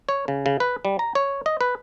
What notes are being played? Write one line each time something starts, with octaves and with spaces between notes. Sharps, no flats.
C#5
C#3
C#3
B4
G3
A#5
C#5
D#5
B4